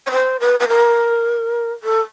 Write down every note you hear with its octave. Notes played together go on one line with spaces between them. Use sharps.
C#5
C5
B4
B4
A#4
A4